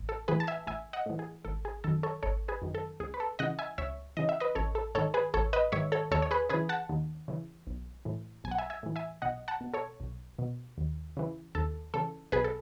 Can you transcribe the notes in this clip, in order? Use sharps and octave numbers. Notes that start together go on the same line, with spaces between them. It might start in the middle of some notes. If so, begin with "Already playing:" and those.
Already playing: A1
A4
A2 E3 G#4 B4
A5
E5 G#5
A1 E5 G#5
D#5 F#5
A2 E3
G#4
G#1 A4
G#4
F#2 D#3 A4
A4 C#5
G#1 A4 C#5
G#4 B4
F#2 D#3
A4
C#2 G#4
B4
A4
C#3 E3 D#5 F#5
E5 G#5
C#2 C#5 E5
C#3 E3 D#5
E5
B4 D#5
A1 A4 C#5
A4
G#2 D#3 A4 C#5
G#4 B4
A1 A4 C#5
B4 D#5
G#2 D#3 C#5 E5
A4 C#5
D#2 A4 C#5
C#5
G#4 B4
C#3 E3 G#4 B4
F#5 A5
D#2
C#3 E3
B1
A2 E3
B1 G#5
F#5
E5 G#5
E5 G#5
A2 E3
E5 G#5
B1 D#5 F#5
F#5 A5
B2
A4 C#5
B1
B2
D#2
C#3 E3
D#2 A4
C#3 E3 A4
B1 G#4 B4
A4